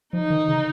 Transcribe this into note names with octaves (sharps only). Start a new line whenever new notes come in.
F3 D#4
D#3
C#3